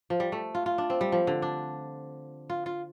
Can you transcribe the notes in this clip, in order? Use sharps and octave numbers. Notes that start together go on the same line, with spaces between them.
F3
G3
A3
F4
F4
D4
C4
G3
F3
D3
D4
F4
F4